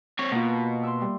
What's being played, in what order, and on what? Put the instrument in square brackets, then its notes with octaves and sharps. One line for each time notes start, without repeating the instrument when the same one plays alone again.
[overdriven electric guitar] C4 C#5
[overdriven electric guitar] B2 [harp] A#3 F4
[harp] E5 C6
G3